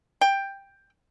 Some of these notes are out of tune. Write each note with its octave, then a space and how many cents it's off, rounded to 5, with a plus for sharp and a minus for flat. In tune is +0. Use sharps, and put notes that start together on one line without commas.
G5 +10